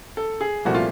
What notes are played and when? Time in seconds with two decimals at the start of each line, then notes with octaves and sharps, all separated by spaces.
0.17 A4
0.41 G#4
0.65 C2 A#2 F3 A3 F#4
0.74 F4